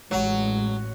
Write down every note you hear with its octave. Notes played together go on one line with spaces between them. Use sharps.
A1 F#3 G#3